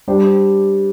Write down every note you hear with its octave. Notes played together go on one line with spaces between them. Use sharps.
G3 D4 G4 C5